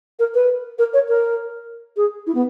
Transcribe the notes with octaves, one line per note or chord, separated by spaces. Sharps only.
A#4
B4
A#4
C#5
A#4
G#4
E4
B3